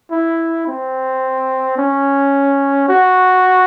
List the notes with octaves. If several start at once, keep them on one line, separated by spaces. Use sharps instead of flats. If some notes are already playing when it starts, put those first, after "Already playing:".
E4
C4
C#4
F#4